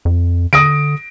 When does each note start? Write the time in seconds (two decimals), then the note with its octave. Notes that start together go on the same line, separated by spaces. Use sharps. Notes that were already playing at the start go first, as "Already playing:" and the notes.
0.05 F2
0.53 D3 D#6 A#6 D7